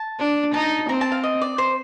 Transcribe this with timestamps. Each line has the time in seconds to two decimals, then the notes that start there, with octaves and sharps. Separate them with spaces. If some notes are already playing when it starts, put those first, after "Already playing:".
Already playing: A5
0.19 D4
0.54 D#4 A5
0.89 C4 A#5
1.01 A5
1.12 F5
1.24 D#5
1.41 D5
1.58 C5